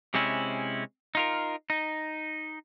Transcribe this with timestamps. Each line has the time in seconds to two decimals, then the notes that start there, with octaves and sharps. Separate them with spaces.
0.14 C3 G#3 C4 C#4 E4
1.15 D#4 F4 A#4
1.70 D#4